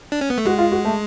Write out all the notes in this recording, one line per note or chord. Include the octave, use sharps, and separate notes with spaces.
D4
C#4
B3
A3
G#3 F#4
F4
F#4
A3